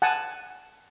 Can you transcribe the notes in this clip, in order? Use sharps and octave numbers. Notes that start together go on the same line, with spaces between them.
F#5 G#5 A5